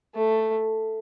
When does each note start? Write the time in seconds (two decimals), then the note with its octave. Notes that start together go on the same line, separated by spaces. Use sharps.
0.15 A3